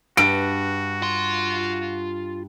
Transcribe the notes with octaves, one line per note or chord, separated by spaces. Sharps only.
G2 F#4 D7
F4 C6